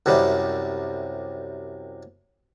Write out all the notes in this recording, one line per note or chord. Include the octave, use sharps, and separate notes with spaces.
C2 F#2 C3 G3